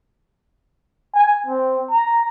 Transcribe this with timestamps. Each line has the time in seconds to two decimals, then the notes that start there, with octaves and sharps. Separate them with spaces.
1.15 G#5
1.47 C4
1.91 A#5